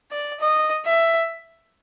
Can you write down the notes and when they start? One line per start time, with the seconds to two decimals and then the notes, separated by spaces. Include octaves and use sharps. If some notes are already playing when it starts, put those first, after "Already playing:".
0.11 D5
0.40 D#5
0.85 E5